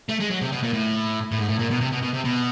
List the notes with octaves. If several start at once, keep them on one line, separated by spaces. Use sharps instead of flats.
A3
G#3
F#3
C3
B2
A#2
A2
A2
G#2
A2
A#2
B2
C3
B2
B2
C3
B2